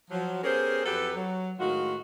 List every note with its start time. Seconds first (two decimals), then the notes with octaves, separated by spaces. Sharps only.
0.11 F3 F#3
0.43 B3 C#4 G4 G#4 A#4 C5
0.85 F2 F#3 G4 A4 B4
1.16 F#3
1.58 A2 D#3 G#3 F4 F#4